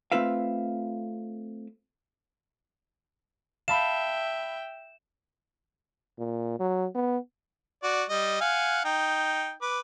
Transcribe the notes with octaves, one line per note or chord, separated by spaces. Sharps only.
A3 C4 F4 B4 E5 F5
E5 F5 G5 A5 B5 E7
A#2
F#3
B3
F#4 D5
G3 D#5
F5 F#5 G#5
D#4 G5
B4 D6